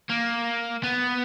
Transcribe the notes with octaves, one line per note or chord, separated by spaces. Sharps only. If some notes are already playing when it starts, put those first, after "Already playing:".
A#3
B3